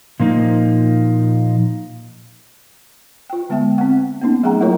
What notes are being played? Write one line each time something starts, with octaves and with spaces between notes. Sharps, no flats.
A#2 F3 A#3 D#4
F4 G5
D3 G#3 B3 E5 G5
C4 F#5
A#3 B3 C#4 D#4
F#3 A3 G#4 F#5 G5 A#5
F#3 A#3 E4 F4 A#4 C#5